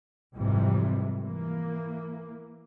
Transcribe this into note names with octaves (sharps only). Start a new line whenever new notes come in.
G#1 F2 G#2 C3 E3 G3
E3 A#3